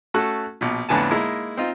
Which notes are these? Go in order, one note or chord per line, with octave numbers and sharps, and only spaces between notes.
A3 C#4 F#4 A4 F#6
A#1 B2
F2 A2 D3 B3 G#5 A5
G#3 A#3 D#4 E4
C4 D#4 F4